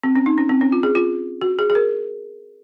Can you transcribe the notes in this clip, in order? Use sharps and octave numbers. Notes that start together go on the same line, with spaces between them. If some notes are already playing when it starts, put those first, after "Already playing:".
C4
C#4
D#4
C#4
C4
C#4
F4
G#4
F4
F#4
G#4
G#4
A#4